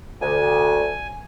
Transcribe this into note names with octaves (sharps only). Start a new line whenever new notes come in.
D2 G#5